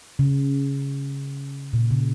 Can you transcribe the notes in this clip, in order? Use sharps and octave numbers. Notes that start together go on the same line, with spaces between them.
C#3
A#2
C#3